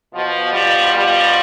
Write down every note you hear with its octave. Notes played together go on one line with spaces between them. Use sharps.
B2 F3
B2 F3 G3
B2 F3 G3